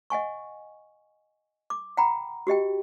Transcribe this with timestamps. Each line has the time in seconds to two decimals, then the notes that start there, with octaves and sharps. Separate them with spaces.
0.10 D#5 F#5 G#5 C#6
1.70 D6
1.97 F#5 G5 A#5 B5
2.47 F#4 G4 D#5 G5